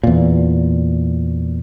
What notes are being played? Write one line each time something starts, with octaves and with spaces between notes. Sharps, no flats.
E2 A#2